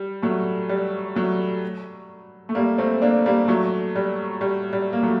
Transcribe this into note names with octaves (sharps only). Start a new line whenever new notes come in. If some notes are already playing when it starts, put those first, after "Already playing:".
Already playing: G3
F#3 A3
G3
F#3 A3
A3
G3 A#3
A3 C4
A#3 D4
G3 A#3
F#3 A3
G3
G3
G3
A#3
F#3 A3